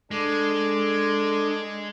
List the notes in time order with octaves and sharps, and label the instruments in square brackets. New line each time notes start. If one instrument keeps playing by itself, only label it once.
[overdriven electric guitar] G#3 [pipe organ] D4 A4 D6